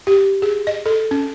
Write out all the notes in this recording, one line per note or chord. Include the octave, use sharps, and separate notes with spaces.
G4
G#4
D#5
A4
C#4